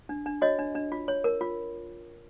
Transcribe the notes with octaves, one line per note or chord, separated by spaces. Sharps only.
D4
D4
F#4 C#5 D#5
D4
D4
F4
C#5
A#4
F4